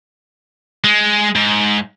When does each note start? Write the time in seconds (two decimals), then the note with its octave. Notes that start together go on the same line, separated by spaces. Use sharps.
0.84 G#3
1.36 G#2